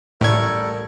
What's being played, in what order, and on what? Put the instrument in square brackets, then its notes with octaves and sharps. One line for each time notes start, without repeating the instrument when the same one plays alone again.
[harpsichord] A1 G3 C#6 [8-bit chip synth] A2 G#6 [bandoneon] A4 A#4